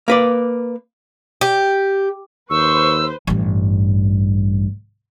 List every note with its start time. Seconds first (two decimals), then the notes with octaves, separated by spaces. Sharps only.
0.08 A#3 B4 D5
1.41 G4
2.50 D#2 B4 C5 C#6 E6
3.27 A1 G2